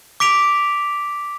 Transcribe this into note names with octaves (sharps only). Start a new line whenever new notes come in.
D6 B6 D7 F7